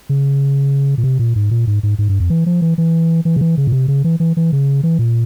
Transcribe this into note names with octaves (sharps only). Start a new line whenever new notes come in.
C#3
A#2
C3
A#2
G#2
A#2
G#2
G#2
G#2
G2
F2
E3
F3
E3
E3
E3
C#3
E3
C#3
A#2
C3
C#3
E3
E3
E3
C#3
E3
A#2